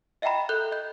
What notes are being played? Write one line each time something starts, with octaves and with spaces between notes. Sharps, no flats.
D#5 E5 F#5 G5 A#5 B5
A4 F#6 G6 G7
D#5 G6